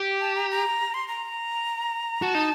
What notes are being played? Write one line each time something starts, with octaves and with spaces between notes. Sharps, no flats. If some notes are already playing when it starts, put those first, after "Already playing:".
Already playing: G4
A5
A#5
A#5
C6
A#5
F#4 A5
D#4